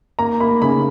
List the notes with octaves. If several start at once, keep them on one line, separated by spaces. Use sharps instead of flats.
A#3 A#5
A#3 B5
C#3 B5